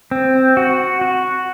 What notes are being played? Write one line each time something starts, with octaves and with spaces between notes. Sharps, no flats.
C4
F#4
F#4